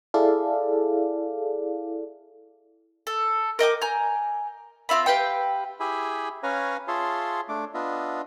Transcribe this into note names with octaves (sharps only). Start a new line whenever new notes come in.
E4 G#4 A4 D5 F5
A4
A#4 D#5 G5 D6
G#5 A#5 G6
C4 F4 E5 B5
G4 B4 F5 G5
E4 G4 G#4 E5 G#5 B5
C#4 B4 C#5 F5 G#5 A#5
F4 G#4 C#5 E5 A5 C6
A3 D4 D6
B3 D4 F4 D#5 E5